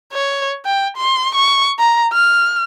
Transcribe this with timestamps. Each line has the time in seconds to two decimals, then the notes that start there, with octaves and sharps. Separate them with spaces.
0.13 C#5
0.66 G5
0.97 C6
1.35 C#6
1.79 A#5
2.13 F6